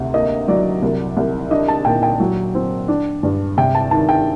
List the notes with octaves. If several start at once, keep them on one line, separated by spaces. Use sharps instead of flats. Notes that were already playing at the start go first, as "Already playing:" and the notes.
Already playing: D2 C3
A#3 D#5
F#3 D5
C2
C2
D4 D#5
A5
A#2 G5
G5
F#3
C4
D4
G2
C3 G5
A5
D#3 A5
G5